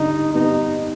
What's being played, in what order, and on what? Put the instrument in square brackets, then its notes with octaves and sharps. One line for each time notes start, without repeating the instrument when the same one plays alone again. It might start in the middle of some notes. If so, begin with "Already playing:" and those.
Already playing: [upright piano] D3 G3 [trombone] D#4
[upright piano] G3 B3 [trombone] D#4